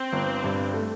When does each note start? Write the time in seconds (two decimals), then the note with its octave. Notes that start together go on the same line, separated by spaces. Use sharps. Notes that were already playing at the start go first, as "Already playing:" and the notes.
Already playing: C4
0.13 G1
0.44 G2
0.74 A3